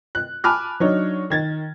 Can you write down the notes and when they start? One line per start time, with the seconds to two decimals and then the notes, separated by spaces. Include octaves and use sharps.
0.15 F#6
0.44 G#5 A5 B5 D6 F6 F#6
0.80 F#3 D4 D#4 C#5
1.30 D#3 G#6 A6